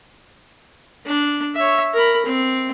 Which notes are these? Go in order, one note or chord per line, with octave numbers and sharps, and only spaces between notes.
D4
C#5 E5
A#4 B5
C4